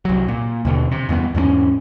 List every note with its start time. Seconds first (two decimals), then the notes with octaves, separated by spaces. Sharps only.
0.05 C2 F#3
0.28 A#2
0.65 D#2 B2 D3
0.91 C3
1.09 E2 G2 D#3 B3
1.35 E2 G#2 G#3 C#4